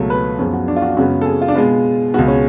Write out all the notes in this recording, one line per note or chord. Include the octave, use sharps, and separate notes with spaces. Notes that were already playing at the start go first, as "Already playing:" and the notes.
Already playing: C#2 B2 F#3 A3
B4
F#2 F3 B3 G#4
F#4
D4
F4
F#4
F#2 C#3 G#3 B3 F#4
A4
G#4
F4
D4
B2 G#3 B3 F4
C#2 B2 G#3 B3 F#4
C#4